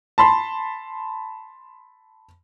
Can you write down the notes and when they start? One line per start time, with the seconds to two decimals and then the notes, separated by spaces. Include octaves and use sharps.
0.18 A5 B5 C6